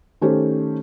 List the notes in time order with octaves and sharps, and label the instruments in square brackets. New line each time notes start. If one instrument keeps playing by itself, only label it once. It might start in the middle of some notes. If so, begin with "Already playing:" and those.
[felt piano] D#3 A3 C#4 G4 C5